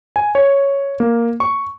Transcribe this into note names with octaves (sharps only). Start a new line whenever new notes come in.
G#5
C#5
A#3
C#6